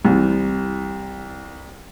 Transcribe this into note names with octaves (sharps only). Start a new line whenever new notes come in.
C2 E3